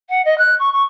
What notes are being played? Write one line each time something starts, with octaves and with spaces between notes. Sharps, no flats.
F#5
D#5
F#6
C#6
C#6